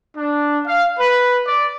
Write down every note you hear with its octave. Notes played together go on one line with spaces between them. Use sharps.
D4
F5
B4
D5